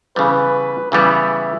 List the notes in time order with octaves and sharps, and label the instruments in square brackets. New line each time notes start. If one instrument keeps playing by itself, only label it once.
[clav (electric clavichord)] C#3 E3 G3 B3 [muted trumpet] B4
[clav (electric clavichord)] C#3 E3 G3 B3 [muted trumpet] E5